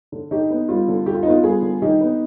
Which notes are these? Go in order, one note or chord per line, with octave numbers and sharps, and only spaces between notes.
D3
D3 D#4 G4
B3
G3 F4
D3
D3 G4
F4
D#4
B3 F4
G3 F4 G#4
D3
D#3 D#4 G4
B3